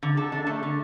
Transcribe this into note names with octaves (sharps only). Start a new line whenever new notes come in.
D3
A4
D4
A3
D3